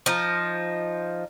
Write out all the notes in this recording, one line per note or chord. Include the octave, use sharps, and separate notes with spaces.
F3 D#4